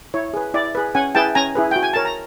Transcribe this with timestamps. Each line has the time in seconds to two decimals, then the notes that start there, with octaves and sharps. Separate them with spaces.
0.14 E4 C#5
0.34 G#4 B4
0.54 E4 D5
0.75 G#4 B4
0.95 C#4 F#5 G#5
1.15 E4 G#4 B4 G5 A5
1.35 C#4 G#5 A#5
1.55 E4 G#4 B4
1.71 F#4 G5
1.83 G#5
1.93 A#4 C#5 A5
2.05 A#5